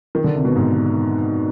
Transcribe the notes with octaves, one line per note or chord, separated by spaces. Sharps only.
D#3
D3
C3
B2
G#2